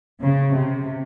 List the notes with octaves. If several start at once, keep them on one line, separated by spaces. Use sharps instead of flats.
C#3
C3